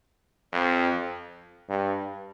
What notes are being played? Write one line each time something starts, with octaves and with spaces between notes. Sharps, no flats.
F2
G2